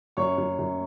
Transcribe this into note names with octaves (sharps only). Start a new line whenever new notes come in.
F#2 C#5 C#6
F#2
F#2